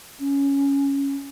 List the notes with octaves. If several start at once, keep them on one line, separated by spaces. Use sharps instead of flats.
C#4